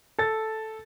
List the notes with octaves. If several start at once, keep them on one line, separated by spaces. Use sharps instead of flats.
A4 A6